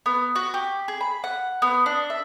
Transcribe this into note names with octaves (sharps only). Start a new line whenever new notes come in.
B3
F#4
G4
G#4
B5
F#5
B3
D4
E5